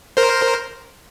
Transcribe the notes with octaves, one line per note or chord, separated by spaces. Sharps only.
A#4 C5